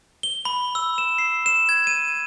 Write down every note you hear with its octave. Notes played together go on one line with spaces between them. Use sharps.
G7
B5
E6
E7
C7
E7
G#6
D#7